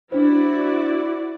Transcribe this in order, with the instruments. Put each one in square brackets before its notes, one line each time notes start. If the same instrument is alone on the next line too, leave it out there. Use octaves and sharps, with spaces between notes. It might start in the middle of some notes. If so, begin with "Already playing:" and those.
[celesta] D4 C5 [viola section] E4 F#4 D5